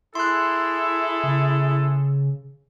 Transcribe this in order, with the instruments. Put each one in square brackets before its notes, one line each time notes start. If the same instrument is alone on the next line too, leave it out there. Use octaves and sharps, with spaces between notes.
[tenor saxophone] E4 [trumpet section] G#4 A4 [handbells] C6 F#6
[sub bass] C#3